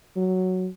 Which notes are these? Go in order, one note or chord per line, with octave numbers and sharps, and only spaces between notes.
F#3